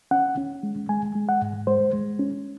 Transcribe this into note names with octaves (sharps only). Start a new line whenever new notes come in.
C#4 F#5
C#4
G#3
G#3 G#5
G#3
F#5
G#2
G#3 C5
G#3
C#4